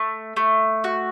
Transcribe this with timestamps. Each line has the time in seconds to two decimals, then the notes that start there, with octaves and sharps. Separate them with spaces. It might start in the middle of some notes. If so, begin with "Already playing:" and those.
Already playing: A3
0.37 A3
0.84 F#4